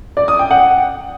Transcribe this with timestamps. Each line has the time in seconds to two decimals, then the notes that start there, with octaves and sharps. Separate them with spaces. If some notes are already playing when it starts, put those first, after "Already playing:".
0.17 D5
0.28 D#6
0.39 G5
0.51 F#5